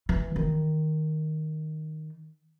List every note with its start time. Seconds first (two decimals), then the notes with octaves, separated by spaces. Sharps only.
0.09 E3
0.36 D#3